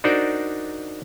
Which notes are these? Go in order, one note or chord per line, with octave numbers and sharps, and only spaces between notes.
D4 D#4 F#4 A#4 C5 D5